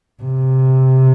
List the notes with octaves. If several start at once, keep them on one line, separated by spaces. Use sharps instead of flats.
C3